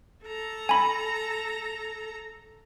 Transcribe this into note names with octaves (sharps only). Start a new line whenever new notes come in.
A4 A#5
G#5 B5